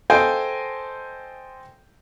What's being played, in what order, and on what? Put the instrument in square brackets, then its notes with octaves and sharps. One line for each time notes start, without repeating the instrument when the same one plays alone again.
[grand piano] A4 C5 D#5 F5 G5 G#5